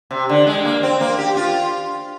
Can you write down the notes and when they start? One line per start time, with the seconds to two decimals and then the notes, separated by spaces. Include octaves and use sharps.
0.11 C3
0.29 D3
0.47 G#3
0.65 A#3
0.83 C4
1.01 A#3
1.18 G4
1.37 F4